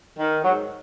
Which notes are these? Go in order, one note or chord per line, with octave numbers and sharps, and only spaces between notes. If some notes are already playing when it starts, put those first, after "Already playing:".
D#3
G#2 F#3